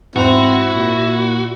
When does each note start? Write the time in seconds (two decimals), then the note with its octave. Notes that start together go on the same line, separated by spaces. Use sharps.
0.16 E2 G#2 C4 E4 F#4
0.74 A#2